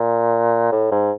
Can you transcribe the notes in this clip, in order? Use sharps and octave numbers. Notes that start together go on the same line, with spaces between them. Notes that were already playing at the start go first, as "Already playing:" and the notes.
Already playing: A#2
A2
G#2